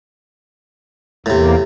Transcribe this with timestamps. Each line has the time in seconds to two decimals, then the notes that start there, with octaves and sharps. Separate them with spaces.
1.26 E2 A2 C3 A#3